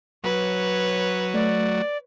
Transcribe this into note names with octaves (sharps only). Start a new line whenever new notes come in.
F#3 B4 C#5
A3 D5